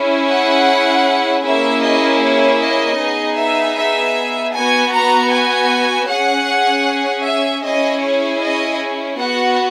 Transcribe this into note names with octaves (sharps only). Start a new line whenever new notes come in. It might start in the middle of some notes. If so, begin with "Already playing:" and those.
Already playing: C#4 E4 G#4
F#5
A#3 C#4 E4 G#4 E5
D#5
C#5
D#5
B3 D#4 G#4
E5
E5
B3 F#4 G#5
A#5
G#5
C#4 G#4 F#5
E5
C#4 E4 G#4 D#5
C#5
D#5
B3 F#4 F#5